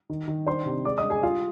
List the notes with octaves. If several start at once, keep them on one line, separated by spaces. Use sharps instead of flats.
D#3
D#3
D4 C5 C6
C3
G#3 D5 D6
D#5 D#6
G#3
G#4 G#5
G3 F4 F5